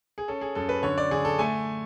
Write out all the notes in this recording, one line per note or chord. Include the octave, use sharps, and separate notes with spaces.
G#4
C#4 A4
G#4
F#2 A4
B4
D3 C#5
D5
D3 G#4
A4
A3 G#5